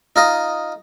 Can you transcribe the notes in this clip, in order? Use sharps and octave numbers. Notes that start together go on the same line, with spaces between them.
D#4 F4 D#5